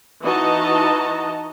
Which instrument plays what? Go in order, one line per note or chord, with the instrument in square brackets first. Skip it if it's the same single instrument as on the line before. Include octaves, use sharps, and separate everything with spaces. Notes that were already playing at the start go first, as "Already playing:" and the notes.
[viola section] E3 D#4 F#4 D#5 A5 A#5